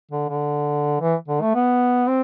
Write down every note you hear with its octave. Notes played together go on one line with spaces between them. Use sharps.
D3
D3
E3
D3
A3
B3
C4